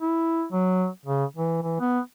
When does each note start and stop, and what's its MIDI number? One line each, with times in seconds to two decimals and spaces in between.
0.01 0.44 64
0.52 0.88 54
1.06 1.25 49
1.36 1.59 52
1.63 1.78 52
1.80 2.00 59